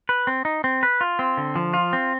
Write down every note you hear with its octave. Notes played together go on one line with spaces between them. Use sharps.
B4
C4
D#4
C4
B4
F4
C4
D3
F3
F4
C4